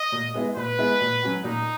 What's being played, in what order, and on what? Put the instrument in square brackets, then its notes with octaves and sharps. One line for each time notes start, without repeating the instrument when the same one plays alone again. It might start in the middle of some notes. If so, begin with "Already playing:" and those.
Already playing: [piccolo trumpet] D#5
[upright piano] A#2
G#3 B3 E4
[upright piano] A#2 [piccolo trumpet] B4
[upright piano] G#3 B3 E4
A#2
F#3 C#4 F#4
[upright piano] A#2 [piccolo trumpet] D#4